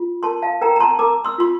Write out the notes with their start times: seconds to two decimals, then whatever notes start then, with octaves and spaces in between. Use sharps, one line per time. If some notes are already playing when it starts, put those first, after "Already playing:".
Already playing: F4
0.23 A#4 A5 C6
0.42 F5 A5
0.61 A#4 G5 A#5
0.76 A#5
0.80 A5 C6
0.99 A#4 A#5 D6
1.25 C6 E6
1.38 F4 C6